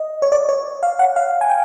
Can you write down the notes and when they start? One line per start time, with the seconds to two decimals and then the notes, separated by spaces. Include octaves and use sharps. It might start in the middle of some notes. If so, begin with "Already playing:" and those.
Already playing: D#5
0.22 C#5
0.32 D5
0.49 C#5
0.83 F5
0.99 F#5
1.16 F5
1.41 G#5
1.50 G5